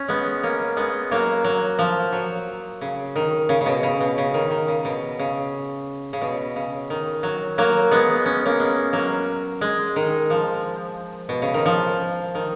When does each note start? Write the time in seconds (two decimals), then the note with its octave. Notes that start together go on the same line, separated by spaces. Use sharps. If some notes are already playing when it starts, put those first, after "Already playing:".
Already playing: C#4
0.08 G#3 B3
0.43 A#3 C#4
0.77 G#3 B3
1.11 F#3 A#3
1.44 F#3
1.79 F3
2.13 F#3
2.81 C#3
3.16 D#3
3.49 C#3
3.61 C#3
3.66 B2
3.83 C#3
4.00 B2
4.18 C#3
4.34 D#3
4.51 D#3
4.68 C#3
4.85 B2
5.19 C#3
6.13 C#3
6.21 B2
6.56 C#3
6.90 D#3
7.23 F#3
7.58 F#3 A#3
7.91 G#3 B3
8.26 C#4
8.45 A#3 C#4
8.60 G#3 B3
8.93 F#3 A#3
9.61 G#3
9.96 D#3
10.30 F3
11.29 B2
11.42 C#3
11.54 D#3
11.66 F3
12.35 D#3